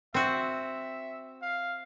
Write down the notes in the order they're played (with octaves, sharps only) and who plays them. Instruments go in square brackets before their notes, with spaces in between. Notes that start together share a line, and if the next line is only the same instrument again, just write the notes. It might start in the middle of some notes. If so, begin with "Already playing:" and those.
[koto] C4 F#4 [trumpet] E5
[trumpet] F5